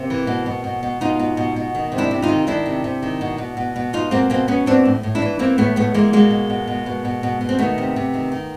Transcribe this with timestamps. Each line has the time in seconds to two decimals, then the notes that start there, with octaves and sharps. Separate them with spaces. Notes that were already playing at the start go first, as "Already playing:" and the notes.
Already playing: C3 A#3 C4
0.10 E3
0.27 B2
0.46 B2
0.64 B2
0.83 B2
1.01 B2 D#4 F4
1.20 B2
1.37 B2
1.56 B2
1.75 D#3
1.92 C3
1.98 D4 E4
2.11 C3
2.22 D#4 F4
2.29 D#3
2.47 D#3 D4 E4
2.66 C3
2.84 C3
3.03 D#3
3.21 B2
3.38 B2
3.57 B2
3.76 B2
3.93 B2 D#4 F4
4.11 B2 A#3 C4
4.30 B2 A#3 C4
4.48 B2 B3 C#4
4.66 E3 C4 D4
4.86 A2
5.03 A2
5.15 D4 E4
5.22 E3
5.39 E3 A#3 C4
5.58 A2 A3 B3
5.76 A2 A3 B3
5.94 E3 G#3 A#3
6.13 B2 G#3 A#3
6.31 B2
6.50 B2
6.67 B2
6.86 B2
7.05 B2
7.23 B2
7.41 B2
7.49 C4
7.59 D#3 A3 B3
7.78 C3
7.96 C3
8.14 D#3
8.32 D#3